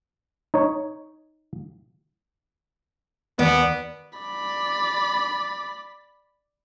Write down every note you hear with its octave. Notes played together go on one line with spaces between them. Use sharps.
D#4 C#5
D#2 B3 D5
D5 B5